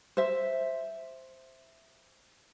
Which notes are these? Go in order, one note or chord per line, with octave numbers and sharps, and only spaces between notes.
C5 E5